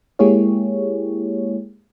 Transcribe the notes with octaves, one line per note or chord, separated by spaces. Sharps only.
G#3 A#3 E4 G4 G#4 C#5